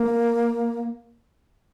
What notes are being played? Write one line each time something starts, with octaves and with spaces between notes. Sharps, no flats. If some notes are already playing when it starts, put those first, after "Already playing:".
Already playing: A#3